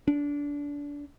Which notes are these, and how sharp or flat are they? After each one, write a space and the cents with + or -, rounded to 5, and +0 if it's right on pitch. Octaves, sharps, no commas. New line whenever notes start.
D4 -25